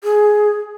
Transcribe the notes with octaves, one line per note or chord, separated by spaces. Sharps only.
G#4